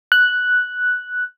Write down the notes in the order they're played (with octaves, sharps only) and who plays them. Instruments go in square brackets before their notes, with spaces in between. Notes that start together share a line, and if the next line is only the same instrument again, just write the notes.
[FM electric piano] F#6